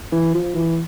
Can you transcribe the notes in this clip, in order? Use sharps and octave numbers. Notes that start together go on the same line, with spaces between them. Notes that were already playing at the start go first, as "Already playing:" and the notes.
E3
F3
E3